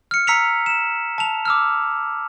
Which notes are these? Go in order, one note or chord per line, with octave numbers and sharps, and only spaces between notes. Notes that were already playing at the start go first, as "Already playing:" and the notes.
F6 C#7
A#5 E6 B6 C#7 F7
E7
A5 F7
D6 E6 F6